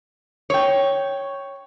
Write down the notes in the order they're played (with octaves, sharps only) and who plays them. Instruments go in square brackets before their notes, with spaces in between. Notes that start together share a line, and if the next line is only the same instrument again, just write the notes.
[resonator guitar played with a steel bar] C#5 G5